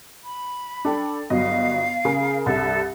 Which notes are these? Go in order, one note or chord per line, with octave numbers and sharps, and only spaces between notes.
B5
D4 A4 G5
G1 F#3 D#5 F5
C#3 G#4 A#4
C2 G2 A4 E5